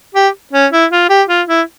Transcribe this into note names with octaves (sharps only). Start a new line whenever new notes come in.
G4
C#4
E4
F4
G4
F4
E4